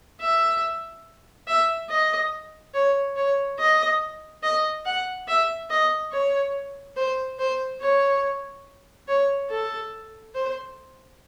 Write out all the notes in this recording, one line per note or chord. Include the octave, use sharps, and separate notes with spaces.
E5
E5
D#5
C#5
C#5
D#5
D#5
F#5
E5
D#5
C#5
C5
C5
C#5
C#5
A4
C5